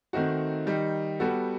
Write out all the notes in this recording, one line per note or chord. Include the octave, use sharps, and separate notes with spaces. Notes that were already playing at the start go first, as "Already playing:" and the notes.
D#3 A3 C4 D#4 F#4
D#3 G3 D#4
G3 B3 F#4 A4